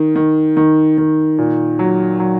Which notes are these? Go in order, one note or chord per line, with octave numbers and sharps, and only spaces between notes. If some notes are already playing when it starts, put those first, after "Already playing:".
Already playing: D#3
D#3
D#3
D#3
A#2
F#3
F#3